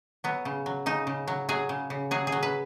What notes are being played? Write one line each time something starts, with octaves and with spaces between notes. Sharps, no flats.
F#3 B3
C#3
F#3
C#3 D#4
C#3
F#3
F#3 G#4
C#3
C#3
F#3 G#4
G#4
F#3
B4